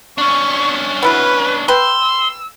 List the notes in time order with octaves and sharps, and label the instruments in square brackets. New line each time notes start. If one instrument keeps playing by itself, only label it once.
[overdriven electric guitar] C#4 D4 [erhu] C#6
[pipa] B3 E4 F#4 [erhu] B4
[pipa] B4 G5 [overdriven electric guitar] C6 [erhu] E6